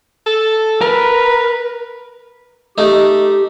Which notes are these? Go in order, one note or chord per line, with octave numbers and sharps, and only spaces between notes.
A4
A#4 B4
A3 D#4 G4